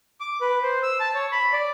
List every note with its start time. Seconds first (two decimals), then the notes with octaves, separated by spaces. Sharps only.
0.21 D6
0.41 B4
0.63 C5
0.83 E6
1.00 A5
1.15 C#5
1.32 B5
1.53 D5